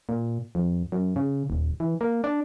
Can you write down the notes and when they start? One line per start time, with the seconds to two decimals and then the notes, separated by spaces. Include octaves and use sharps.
0.09 A#2
0.55 F2
0.92 F#2
1.16 C#3
1.50 D#1
1.80 E3
2.01 A#3
2.24 D4